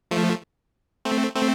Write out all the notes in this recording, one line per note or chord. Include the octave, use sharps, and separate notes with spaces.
F3 A3
A3 C4
A3 C4